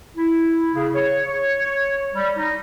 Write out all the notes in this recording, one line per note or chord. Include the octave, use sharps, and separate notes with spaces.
E4
C#3
C#5
G3
D#4